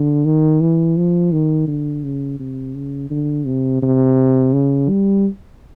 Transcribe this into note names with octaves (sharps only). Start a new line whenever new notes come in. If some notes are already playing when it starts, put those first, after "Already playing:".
Already playing: D3
D#3
E3
F3
D#3
D3
C#3
C3
C#3
D3
C3
C3
C#3
G3